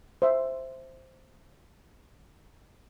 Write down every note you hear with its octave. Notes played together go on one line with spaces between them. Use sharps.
C5 E5